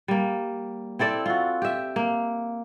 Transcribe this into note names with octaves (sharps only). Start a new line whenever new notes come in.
G3 A#3
C4 E4 A4 D5
F4 F#4
G4 E5
A#3